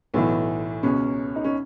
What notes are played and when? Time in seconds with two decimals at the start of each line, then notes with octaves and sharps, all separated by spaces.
0.14 B1 A2 E3 B3
0.83 C#2 B2 C#4
1.36 D#4
1.44 C#4